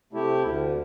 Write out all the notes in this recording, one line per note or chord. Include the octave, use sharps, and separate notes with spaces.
C3 A3 E4 G4
D2